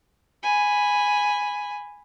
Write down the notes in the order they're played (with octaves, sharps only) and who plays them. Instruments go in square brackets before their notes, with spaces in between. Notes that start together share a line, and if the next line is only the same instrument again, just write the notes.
[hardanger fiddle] G#5 B5